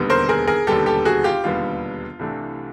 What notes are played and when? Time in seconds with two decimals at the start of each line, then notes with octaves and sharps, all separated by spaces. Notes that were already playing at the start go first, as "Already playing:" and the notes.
Already playing: E1 D#2 D3 G3 B3
0.10 A#4 C5
0.29 G#4 A#4
0.47 G#4 A#4
0.67 E1 D#2 D3 G3 B3 G4 A4
0.86 G4 A4
1.05 F#4 G#4
1.24 F4 G4
1.44 E1 D#2 D3 G3 B3 F4
2.19 C2 C3 E3 A3 D4